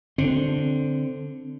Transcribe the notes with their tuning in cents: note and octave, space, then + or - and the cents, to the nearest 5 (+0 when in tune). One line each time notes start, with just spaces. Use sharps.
D3 +0 C4 +0